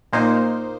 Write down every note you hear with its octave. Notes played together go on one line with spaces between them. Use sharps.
A#2 A#3 D#4 C5